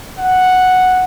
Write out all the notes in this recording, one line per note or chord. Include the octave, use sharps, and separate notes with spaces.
F#5